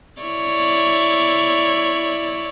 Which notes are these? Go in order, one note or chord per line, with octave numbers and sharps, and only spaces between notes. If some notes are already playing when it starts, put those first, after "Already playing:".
E4 C#5 D5